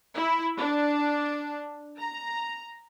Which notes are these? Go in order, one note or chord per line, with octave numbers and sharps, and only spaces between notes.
E4
D4
A#5